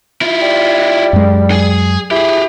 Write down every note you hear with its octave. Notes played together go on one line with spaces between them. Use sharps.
E4 F4
G3
F#2 G#3
G#4 G#5
E4 G4 G#4